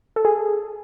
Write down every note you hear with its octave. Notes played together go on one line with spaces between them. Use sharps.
A4
G#4